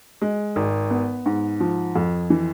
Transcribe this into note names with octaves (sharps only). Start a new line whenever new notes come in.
G#3
G#1
B3
G#2
F3
F2
E3